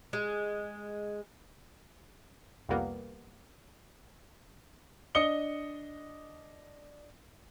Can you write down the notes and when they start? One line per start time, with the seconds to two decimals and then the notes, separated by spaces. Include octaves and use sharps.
0.13 G#3
2.69 C2 F2 G3 A#3 B3
5.15 D4 D#5 D#6 C#7 G7